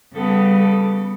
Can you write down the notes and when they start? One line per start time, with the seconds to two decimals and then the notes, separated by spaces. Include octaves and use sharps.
0.14 C#3 G3 B3 A4
0.59 A4